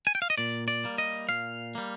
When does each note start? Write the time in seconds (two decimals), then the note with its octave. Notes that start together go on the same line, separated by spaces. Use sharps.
0.07 G#5
0.15 G5
0.22 F5
0.30 D#5
0.38 A#2 D5
0.68 D5
0.84 G3 A#3
0.98 D#5
1.29 A#2 F5
1.75 G3 A#3